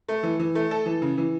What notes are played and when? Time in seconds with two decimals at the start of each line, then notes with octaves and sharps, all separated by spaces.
0.08 A3
0.23 E3
0.39 E3
0.55 A3
0.71 A4
0.86 E3
1.02 C#3
1.18 E3